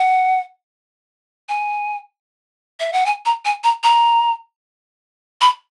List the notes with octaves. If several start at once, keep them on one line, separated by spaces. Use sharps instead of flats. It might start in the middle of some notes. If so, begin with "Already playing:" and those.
Already playing: F#5
G#5
E5
F#5
G#5
A#5
G#5
A#5
A#5
B5